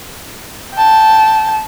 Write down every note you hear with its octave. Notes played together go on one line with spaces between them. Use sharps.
G5 A5